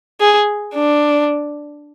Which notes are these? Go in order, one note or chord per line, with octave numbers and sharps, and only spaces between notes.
G#4
D4